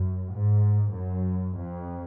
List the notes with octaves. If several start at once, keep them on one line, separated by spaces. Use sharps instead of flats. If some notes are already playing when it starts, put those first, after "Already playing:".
Already playing: F#2
G#2
F#2
F2